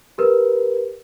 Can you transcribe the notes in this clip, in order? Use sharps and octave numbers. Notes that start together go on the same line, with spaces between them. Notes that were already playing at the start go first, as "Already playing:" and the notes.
G4 A#4 B4